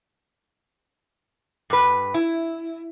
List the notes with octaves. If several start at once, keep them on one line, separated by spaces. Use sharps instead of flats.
G2 B4
E4